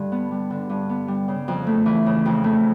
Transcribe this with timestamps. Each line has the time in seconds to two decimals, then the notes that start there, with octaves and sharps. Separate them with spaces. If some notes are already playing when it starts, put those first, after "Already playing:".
Already playing: G2 D3 G3
0.12 B3
0.31 G3
0.50 D3
0.70 G2
0.89 B3
1.08 G3
1.28 C#3
1.48 F2
1.67 A3
1.86 E3
2.06 C#3
2.25 F2
2.44 A3